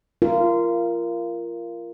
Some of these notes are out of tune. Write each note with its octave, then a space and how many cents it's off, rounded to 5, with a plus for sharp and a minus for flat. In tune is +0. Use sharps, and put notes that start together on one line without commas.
F4 -25 A#4 +0